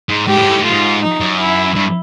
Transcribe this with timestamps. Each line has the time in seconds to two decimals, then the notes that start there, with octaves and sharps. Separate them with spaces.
0.09 G#2
0.27 G#2 G4
0.35 A2
0.42 G#2
0.49 A2
0.56 G#2
0.63 A2 F4
0.71 G#2
1.02 D#4
1.20 F#2
1.40 E4
1.76 G2